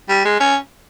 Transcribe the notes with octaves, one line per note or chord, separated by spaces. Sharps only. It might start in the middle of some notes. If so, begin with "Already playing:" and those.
G3
G#3
C#4